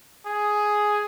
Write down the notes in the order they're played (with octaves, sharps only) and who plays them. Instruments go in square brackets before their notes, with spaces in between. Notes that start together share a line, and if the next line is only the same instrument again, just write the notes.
[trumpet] G#4